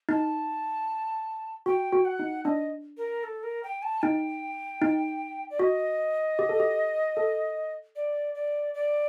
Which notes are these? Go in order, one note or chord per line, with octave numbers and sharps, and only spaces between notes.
D#4 A5
F#4 G5
F#4
F#5
D#4
D4 D#5
A#4
A4
A#4
G5
A5
D#4 G5
D#4
D5
F#4 D#5
G4
A4
G4
A4
D5
D5
D5